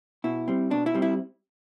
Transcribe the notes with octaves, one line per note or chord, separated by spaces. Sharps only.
B2 E4
G3 C4
B2 D4
E4
G3 C4
E4